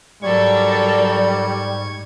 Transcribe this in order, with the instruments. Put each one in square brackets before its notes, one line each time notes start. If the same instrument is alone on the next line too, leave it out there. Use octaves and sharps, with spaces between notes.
[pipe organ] G#2 C#6 G#6 [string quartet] F#3 A4 A#4 [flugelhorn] G3 [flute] D5